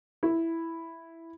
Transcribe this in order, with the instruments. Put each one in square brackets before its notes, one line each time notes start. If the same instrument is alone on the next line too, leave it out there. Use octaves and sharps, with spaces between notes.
[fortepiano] E4